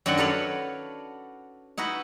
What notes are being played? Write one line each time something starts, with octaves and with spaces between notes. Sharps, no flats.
F#2 D#3 F#3 D4 D5 F#5
F#4 A4 B4 C#5 D5 F5
D#4 E4 F#4 B4